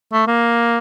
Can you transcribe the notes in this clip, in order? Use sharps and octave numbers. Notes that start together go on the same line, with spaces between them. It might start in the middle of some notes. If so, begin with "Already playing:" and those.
A3
A#3